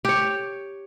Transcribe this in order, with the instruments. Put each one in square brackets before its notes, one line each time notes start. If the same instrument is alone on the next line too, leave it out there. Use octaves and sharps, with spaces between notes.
[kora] G4 C#5